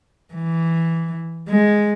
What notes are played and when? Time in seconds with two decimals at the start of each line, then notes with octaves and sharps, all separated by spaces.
0.34 E3
1.49 G#3